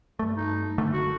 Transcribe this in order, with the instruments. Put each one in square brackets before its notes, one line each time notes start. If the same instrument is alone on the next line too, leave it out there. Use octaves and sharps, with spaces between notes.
[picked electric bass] G2 A3
[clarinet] D#4
[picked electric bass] F#1 D3 A3
[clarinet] F#4